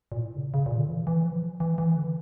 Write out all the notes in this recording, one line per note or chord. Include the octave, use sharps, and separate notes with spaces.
A#2
A2
C#3
C#3
A#2
D3
E3
E3
F3
E3
E3
D3